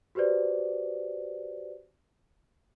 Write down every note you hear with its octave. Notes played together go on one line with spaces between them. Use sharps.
F#4 G4 B4 C5 D5